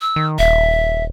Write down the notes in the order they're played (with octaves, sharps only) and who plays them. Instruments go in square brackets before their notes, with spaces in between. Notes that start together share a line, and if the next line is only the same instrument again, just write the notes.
[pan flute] E6
[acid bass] D#3
[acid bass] D#1 [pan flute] E5